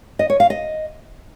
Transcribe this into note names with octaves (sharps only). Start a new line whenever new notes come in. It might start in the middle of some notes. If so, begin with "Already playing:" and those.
D#5
C#5
F5
D#5